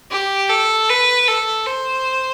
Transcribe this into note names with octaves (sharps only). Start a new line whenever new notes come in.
G4
A4
B4
A4
C5